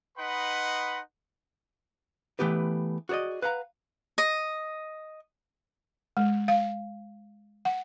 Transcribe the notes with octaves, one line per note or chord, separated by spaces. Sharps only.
D#4 B4 D#5 F#5 B5 C6
E3 A3 B3 G4 B4
F#4 G#4 C5 D5 D#5
B4 F5 F#5 A#5
D#5
G#3
F5
F#5